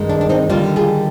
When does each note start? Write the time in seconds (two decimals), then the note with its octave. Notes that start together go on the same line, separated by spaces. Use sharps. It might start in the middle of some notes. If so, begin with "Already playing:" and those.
Already playing: G2 D#3 G#3
0.09 D4
0.21 D4
0.29 C4 D#4
0.49 D#2 D3 G3 A#3 D4 F4
0.76 F4 G#4